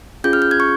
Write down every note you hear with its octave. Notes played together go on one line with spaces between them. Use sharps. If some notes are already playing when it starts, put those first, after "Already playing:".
C#4 F4 G#4 G6
F6
G6
G#6
C#6